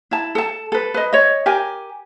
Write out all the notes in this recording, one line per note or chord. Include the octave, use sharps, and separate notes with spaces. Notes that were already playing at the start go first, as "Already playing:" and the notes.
E4 A5
A4 A5
A4 B4
B4 D#5
C#5 D#5
G4 A#4 G#5